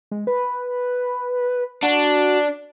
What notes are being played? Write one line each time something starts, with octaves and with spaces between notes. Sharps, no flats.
G#3
B4
D4 F#4